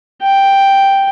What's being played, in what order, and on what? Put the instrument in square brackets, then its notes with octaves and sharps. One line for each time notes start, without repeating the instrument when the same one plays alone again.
[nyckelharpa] G5